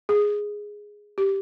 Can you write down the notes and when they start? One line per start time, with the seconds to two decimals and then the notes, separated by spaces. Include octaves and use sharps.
0.09 G#4
1.18 G4